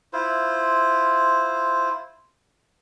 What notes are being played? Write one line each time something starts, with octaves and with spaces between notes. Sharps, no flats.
E4 F4 C5